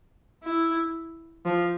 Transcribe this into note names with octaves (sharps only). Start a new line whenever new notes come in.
E4
F3